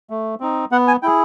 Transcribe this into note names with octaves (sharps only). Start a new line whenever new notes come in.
A3
C4 D#4
B3 F#5
G#5
E4 G#4 G5